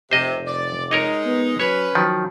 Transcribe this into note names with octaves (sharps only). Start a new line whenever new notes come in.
F1 C3 C5 D#5
D5
G#3 D#4 A#4 C#5 D#5
B3
F#3 C#4 B4 C#5
D#3 F3 F#3